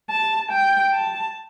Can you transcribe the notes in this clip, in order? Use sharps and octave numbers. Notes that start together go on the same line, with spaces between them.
A5
G5
A5